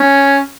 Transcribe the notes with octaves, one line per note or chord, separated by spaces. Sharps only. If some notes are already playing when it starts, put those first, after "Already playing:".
Already playing: C#4